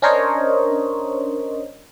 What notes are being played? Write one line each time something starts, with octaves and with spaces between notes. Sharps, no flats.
C#4 D4 A#4 C5 C#5 D#5